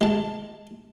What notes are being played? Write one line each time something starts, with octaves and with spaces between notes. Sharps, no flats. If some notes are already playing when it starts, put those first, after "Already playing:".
G#3 A5